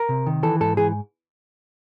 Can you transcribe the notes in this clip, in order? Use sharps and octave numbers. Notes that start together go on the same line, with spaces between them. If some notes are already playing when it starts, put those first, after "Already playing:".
Already playing: A#4
C3
D#3
E3 A4
G#2 A4
E3 G#4